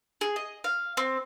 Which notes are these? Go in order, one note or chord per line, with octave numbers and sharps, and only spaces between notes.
G#4
D#5
F5
C4